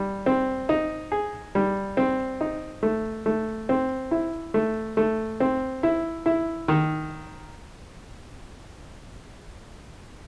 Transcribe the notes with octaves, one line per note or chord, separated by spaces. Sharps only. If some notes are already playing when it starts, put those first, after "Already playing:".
Already playing: G3
C4
D#4
G#4
G3
C4
D#4
A3
A3
C4
E4
A3
A3
C4
E4
E4
D#3